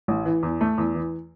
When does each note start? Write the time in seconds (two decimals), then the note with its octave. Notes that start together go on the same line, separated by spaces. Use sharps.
0.08 A1
0.25 E3
0.43 E2
0.61 A3
0.78 E2
0.95 E3